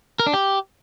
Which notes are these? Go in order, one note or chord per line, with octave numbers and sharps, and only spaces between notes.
A#4
D4
G4